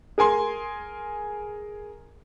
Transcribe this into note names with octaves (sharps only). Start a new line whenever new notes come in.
G#4 A#4 G#5 C6